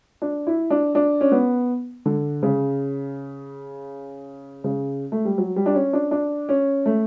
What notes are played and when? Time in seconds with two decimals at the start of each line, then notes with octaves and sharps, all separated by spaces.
0.22 D4
0.47 E4
0.70 D4
0.95 D4
1.21 C#4
1.32 B3
2.06 D3
2.43 C#3
4.64 C#3
5.12 A3
5.25 G3
5.38 F#3
5.56 G3
5.66 D4
5.75 C#4
5.93 D4
6.11 D4
6.49 C#4
6.86 A3